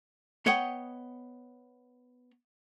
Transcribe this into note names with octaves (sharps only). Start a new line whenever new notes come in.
B3 C#5 D#5 F#5 G5